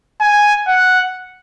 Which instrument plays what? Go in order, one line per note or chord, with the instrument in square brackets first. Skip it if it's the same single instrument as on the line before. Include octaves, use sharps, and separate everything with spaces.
[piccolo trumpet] G#5
F#5